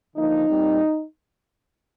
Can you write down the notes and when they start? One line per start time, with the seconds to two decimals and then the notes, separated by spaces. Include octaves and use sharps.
0.17 D3 F3 A#3 D#4
0.49 A#2 G3 C4